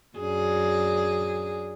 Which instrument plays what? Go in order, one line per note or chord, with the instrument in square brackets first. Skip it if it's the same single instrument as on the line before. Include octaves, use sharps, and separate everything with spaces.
[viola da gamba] F#2 D4 G#4